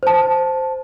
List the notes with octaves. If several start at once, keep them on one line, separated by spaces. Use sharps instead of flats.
C5 A5